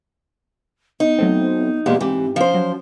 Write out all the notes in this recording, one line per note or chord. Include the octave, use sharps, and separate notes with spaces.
B3 D#4
F#3 A3 C4
E2 A#2 G#3 G4
G#2 E3 C4 G4
F3 C#4 C5
F#3